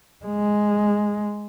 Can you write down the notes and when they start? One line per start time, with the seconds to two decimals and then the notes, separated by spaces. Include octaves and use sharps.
0.25 G#3